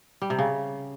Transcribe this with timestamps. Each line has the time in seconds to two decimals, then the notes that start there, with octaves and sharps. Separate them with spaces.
0.22 G3
0.30 C3
0.39 C#3